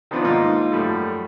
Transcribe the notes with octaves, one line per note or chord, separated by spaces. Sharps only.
D#3 F3 B3 C4 D4 F4
G#2 A#3 D#4 F4
F#2 F3 G3 A3